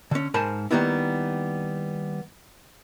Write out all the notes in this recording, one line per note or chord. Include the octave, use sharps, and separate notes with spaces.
D3 C#4
G#2 A#4 C5 G#5 A5 B5
D#3 F#3 G3 A#3 B3 E4